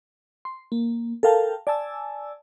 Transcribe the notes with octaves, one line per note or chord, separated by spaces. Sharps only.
C6
A#3
A4 A#4 F5 G5 A5
D5 G#5 A5 E6